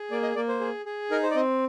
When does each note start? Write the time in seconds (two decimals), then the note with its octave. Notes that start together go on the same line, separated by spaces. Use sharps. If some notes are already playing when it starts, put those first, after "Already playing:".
Already playing: G#4
0.11 A#3 D5
0.23 D#5
0.36 A#3 D5
0.48 C5
0.60 G#4
0.86 G#4
1.11 D#4 A#4
1.23 C5
1.31 D5
1.35 C4 D#5